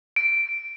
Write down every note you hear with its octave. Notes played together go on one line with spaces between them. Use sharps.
D7